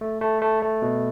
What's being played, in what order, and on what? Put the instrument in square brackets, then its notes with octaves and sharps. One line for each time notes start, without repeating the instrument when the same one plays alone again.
[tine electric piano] A3
A3
A3
A3
B2